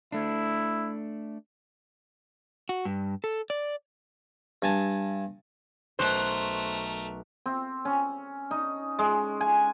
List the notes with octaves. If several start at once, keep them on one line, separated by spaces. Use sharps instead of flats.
A3 D4 E4
F#4
G2
A4
D5
G2 G#5 A5
B1 A3 A#4 C5 C#6 F#6
C4
C#4
D#4
G#3
G#5